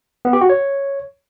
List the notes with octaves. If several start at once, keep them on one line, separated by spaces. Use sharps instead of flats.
B3
G4
F#4
C#5